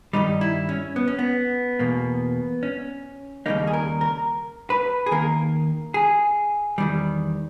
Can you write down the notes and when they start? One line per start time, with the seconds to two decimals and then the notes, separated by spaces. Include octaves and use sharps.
0.13 G2 D#3 G3 D#4
0.41 E4
0.69 C#4
0.96 B3
1.07 C#4
1.19 B3
1.79 E2 B2 A#3
2.63 C#4
3.46 D#2 C#3 G3 A#3 D#4
3.67 G#4
3.73 A#4
4.01 A#4
4.70 B4
5.06 G#4
5.11 D#2 D#3 A#3 A#4
5.94 G#4
6.78 E2 D#3 G3